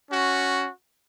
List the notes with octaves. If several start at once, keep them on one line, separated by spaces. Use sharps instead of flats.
C#4 F#4